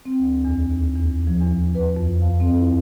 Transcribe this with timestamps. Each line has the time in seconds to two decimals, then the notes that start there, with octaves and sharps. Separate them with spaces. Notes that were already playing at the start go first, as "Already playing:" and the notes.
0.05 C4
0.19 D2
0.45 E2
0.71 D#2
0.96 E2
1.27 F3
1.41 E2
1.75 B4
1.96 F2
2.21 F5
2.40 C4
2.58 E4